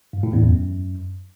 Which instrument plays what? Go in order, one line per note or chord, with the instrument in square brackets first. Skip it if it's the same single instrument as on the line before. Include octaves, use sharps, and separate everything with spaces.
[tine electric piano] G2
A2
E2
F#2